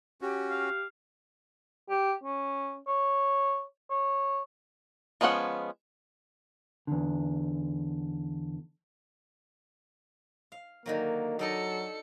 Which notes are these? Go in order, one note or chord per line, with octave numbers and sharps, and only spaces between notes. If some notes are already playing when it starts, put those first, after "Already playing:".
C#4 F#4 G4
F5
G4
C#4
C#5
C#5
F3 G#3 B3 C#4 F#5
E2 D3
F5
D3 D#3 F#3 A#3
F#3 D#4 A4 D5 D#5 C#7